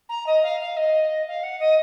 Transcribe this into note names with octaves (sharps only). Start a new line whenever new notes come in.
A#5
D#5
F5
F5
D#5
F5
F#5
D#5